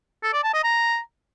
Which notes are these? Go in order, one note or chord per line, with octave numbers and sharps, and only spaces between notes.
A4
D5
A5
D#5
A#5